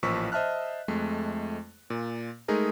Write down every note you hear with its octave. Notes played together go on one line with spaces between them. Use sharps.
A1 A#2 F3 C#6 E6 B6
C5 D#5 E5 A5 F6 F#6
F2 G#3 A3
A#2
G#3 A3 D#4 G#4 A#4